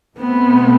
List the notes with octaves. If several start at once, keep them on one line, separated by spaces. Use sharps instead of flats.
B2 A3 B3 C4